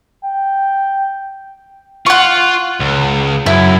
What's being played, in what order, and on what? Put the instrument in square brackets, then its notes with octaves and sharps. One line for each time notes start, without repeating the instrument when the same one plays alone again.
[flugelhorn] G5
[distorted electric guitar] F4 [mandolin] F#5 C#6
[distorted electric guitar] C#2
[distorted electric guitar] F#2 [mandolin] E4